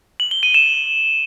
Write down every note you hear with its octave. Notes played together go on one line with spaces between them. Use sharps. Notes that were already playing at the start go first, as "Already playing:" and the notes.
F#7
G7
D#7
E7